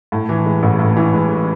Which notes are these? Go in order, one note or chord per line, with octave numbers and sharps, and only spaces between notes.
A2
E3
G#3
A1
A2
E3
G#3